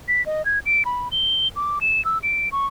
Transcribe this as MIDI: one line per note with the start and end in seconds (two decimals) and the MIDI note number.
0.08 0.24 95
0.26 0.45 75
0.45 0.59 92
0.66 0.83 98
0.85 1.08 83
1.12 1.48 103
1.56 1.79 86
1.81 2.04 100
2.05 2.18 88
2.23 2.49 98
2.52 2.67 85